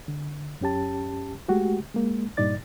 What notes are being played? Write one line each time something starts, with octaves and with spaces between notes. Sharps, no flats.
D3
F#2 C#4 G4 A5
G#3 A3 F#4 G4
G#3 A#3
G2 A#2 D#4 D5 A6